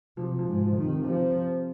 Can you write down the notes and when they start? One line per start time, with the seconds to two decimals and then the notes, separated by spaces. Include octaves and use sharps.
0.17 C3 F3
0.39 F3
0.47 G#2
0.62 F3
0.77 D#3
0.84 C3
1.06 C3 F3
1.35 C3